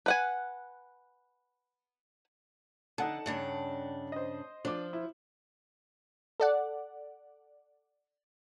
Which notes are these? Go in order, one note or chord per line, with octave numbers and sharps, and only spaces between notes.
B4 F#5 G#5
D3 D#4 F#5 A5
G2 C#3 D4
C5 D#5
F3 D4 D6
E4
A4 D5 F#5